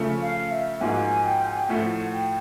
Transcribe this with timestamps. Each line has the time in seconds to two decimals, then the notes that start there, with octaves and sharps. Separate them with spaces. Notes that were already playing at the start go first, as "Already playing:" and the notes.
Already playing: C#3 F3 A3
0.22 F5
0.52 E5
0.81 G#2 F3 A#3 D#4 F#4 G#5
1.25 G5
1.45 G#5
1.57 G5
1.69 A2 F3 A3 F#5
2.13 G5